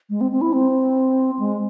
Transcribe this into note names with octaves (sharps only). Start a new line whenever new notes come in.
G#3
C4
C4
E4
C4
G#3